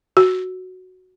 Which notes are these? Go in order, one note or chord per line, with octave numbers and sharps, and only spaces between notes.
F#4